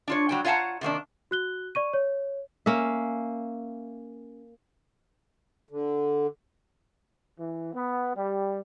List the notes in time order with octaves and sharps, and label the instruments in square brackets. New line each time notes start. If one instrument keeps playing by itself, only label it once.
[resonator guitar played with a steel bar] D4 F4 C#5
F#3 G3 G5
F4 C#5 F5 F#5 A5 A#5
C3 D#3 A#3 D4
[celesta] F#4 F#6 G7
D5 C#6 D#7
C#5
[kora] A#3 C#4 E5
[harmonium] D3
[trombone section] E3
B3
G3